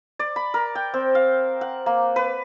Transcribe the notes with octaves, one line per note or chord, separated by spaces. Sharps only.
D5
B5
A#4
G5
C4
F5
F#5
A#3
B4